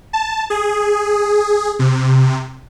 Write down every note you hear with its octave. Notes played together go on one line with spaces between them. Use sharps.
A5
G#4
C3